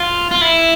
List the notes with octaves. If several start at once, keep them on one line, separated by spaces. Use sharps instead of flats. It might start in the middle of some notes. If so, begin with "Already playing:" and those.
Already playing: F4
F4
E4